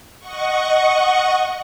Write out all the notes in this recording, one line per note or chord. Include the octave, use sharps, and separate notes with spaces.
D#5 F#5 C#6